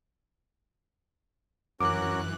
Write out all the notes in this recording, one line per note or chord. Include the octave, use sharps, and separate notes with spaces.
F#2 E3 C#4 F#4 A#4 D6 F#6